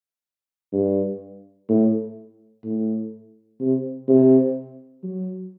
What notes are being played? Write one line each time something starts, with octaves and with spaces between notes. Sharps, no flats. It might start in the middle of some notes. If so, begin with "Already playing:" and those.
G2
A2
A2
C3
C3
F#3